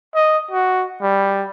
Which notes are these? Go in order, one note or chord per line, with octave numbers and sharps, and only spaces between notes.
D#5
F#4
G3